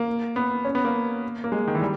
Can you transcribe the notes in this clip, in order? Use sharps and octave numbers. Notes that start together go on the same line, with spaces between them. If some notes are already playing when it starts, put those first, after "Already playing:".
Already playing: A#3
B3
C#4
B3
A#3
A#3
G#3
D#3
E3
G3